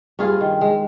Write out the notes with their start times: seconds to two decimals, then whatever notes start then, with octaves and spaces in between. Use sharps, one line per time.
0.19 G2 F4 G#4
0.41 D#3
0.61 G#3